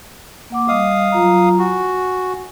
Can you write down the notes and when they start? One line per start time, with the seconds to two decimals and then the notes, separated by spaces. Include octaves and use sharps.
0.50 A#3 F#5 D6
0.68 G3 D#5 F5 D#6
1.12 F#3 F4 A#5
1.59 F#4 G#5